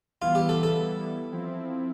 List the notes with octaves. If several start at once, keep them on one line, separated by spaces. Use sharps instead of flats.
E3 G3 B3 E4 F4
G4
A4
A4
F3 C4 E4